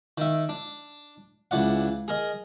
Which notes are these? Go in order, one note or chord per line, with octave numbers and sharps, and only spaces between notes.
D#3 E5
D4
C#2 E3 D5 F#5
G#4 A#4 D#5